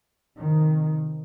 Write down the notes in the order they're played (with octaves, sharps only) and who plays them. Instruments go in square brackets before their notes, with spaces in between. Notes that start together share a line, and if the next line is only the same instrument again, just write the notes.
[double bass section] F2 C3 D#3